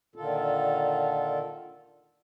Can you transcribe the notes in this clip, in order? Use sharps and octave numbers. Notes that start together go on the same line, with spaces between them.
A#2 D3 D#3 F4 A4